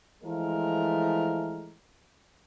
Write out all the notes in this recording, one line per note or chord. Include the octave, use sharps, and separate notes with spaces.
E3 F3 G#3 A3 A#4